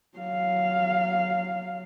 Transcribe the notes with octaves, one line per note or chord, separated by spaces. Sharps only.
F#3 F5